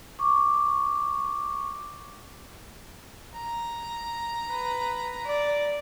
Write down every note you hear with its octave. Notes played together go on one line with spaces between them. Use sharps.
C#6 D6
A#5
B4
D5